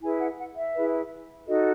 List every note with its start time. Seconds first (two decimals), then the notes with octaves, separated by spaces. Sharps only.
0.02 E4 G#4 B4 G#5
0.20 F#5
0.39 F#5
0.57 E5
0.75 E4 G#4 B4
1.48 D#4 F#4 A4 D#5